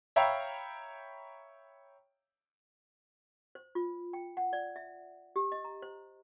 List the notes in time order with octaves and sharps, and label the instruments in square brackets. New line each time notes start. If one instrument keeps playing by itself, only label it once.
[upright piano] C#5 E5 F5 G5 A#5 B5
[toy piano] C5
F4
G5
F#5
D5
E5
G4
D#5
A#5
C5